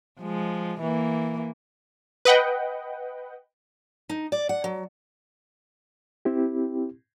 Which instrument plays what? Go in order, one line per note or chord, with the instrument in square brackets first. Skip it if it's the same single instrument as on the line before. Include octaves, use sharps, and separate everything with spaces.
[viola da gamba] F3 G#3
E3 A#3
[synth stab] B4 D#5 F#5 G5
[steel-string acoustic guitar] D#4
D5
F#5
F#3
[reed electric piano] C4 E4 G4